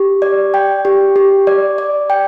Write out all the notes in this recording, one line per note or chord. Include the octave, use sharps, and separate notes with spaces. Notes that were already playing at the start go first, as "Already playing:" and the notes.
Already playing: G4
D5
G5
G4
G4
D5
D5
G5